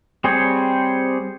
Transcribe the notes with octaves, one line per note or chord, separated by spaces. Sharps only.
G3 C4 G#4 C5 C#5